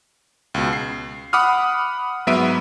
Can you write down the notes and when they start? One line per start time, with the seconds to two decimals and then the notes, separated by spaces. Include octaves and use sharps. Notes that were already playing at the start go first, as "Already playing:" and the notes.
0.54 C#2 B2
0.73 C7
1.33 F#5 B5 D6 D#6 F6
2.27 G#2 F#3 B3 E5 D7 D#7